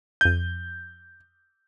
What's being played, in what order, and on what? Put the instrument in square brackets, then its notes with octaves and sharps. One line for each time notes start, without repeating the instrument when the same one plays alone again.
[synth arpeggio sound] F2 D#7 [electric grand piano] G6